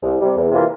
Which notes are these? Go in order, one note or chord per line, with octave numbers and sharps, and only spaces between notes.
C2
C3 G3
E2
C3 E3 A#3 F4